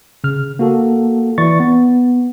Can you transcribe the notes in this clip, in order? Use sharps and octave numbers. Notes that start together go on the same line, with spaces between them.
C#3 F6
A#3 F#4 A4
E3 E4 D5 C#6 A6
B3